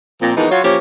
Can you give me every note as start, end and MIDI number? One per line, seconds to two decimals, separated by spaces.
0.21 0.31 46
0.21 0.31 53
0.21 0.31 60
0.36 0.46 52
0.36 0.46 53
0.36 0.46 56
0.36 0.46 58
0.36 0.46 59
0.36 0.46 63
0.50 0.63 54
0.50 0.63 65
0.50 0.63 73
0.64 0.77 53
0.64 0.77 58
0.64 0.77 61
0.64 0.77 67
0.64 0.77 73